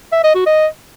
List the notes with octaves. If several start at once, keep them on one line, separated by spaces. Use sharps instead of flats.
E5
D#5
F#4
D#5